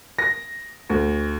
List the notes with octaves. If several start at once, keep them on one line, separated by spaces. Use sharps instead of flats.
A#6
D2